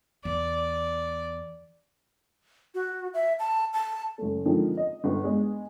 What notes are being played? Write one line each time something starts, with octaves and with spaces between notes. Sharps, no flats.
E2 D5
F#4
E5
A5
A5
F#1 A3
D3 D#3 F3 G#3 C4
D#5
G1
G#3 B3